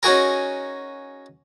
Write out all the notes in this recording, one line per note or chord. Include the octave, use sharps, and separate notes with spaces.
C#4 D#4 F#4 G#4 A#4